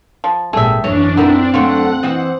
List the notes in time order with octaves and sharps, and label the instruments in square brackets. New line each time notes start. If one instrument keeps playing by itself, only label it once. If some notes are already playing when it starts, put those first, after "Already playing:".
[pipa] F3
[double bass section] G#1 A#2 G3 [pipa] A3 E5 [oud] G#4
[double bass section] F#2 E3 [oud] C#4 D#5 [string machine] D4
[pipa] B3 [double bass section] C4 [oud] D#4 E4 A#4
[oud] D3 F#3 A3 [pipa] F4 F#4 [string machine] F#5
[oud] E3 C4 D#5